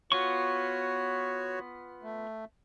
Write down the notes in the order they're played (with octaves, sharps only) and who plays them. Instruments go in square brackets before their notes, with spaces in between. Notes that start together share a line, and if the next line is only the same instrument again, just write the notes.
[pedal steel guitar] B3 F4 C#6 [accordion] F#4 C#5
[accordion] A3